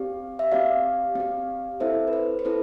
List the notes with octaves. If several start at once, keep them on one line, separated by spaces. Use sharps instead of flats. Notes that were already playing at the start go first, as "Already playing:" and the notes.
Already playing: C4 G4 D5 F5
E5
C4 G4 D5 F5
C4 G4
C4 E4 A4 C5 E5
B4
C5
C5
C4 E4 A4 B4